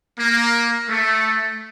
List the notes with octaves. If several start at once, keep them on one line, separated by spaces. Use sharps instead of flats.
A#3
A3